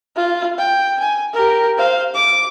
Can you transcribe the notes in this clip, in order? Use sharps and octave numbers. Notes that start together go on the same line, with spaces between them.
F4
G5
G#5
G4 A#4
C5 F5
D6